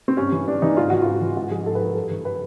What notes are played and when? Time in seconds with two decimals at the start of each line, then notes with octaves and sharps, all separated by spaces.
0.08 C4
0.17 G2 C#4
0.32 E3
0.47 G2 D4
0.62 E3 D#4
0.77 G#2 F4
0.90 E3 F#4
1.02 G#2 F4
1.21 E3
1.36 G#2 F#4
1.51 F3 G#4
1.66 G#2 A4
1.75 B4
1.80 F3 A#4
1.95 G2 A4
2.11 E3
2.25 B4